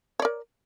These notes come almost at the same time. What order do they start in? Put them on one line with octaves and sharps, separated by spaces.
C#5 D5 A#4